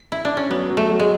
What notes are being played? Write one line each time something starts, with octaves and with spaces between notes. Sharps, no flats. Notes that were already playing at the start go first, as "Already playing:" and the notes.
Already playing: F#4
E4
D4
C#4
F#3 B3
F#3
A3
F#3
G#3